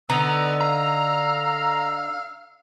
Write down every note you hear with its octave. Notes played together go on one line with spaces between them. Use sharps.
D3 B3 D#4 A#5 E6
F5 A#5